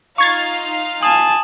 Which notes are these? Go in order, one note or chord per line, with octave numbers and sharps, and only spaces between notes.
D#4 F4 F5 C#6 G#6 A6
G#5 A5 D#6